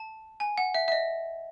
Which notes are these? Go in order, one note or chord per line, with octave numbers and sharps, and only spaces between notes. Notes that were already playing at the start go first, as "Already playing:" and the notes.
Already playing: A5
G#5
F#5
E5
E5
D#5